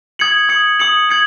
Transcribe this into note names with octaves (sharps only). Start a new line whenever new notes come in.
D#6 G#6 C#7 F#7
D#6 G#6 C#7 F#7
D#6 G#6 C#7 F#7
G#6 C#7 F#7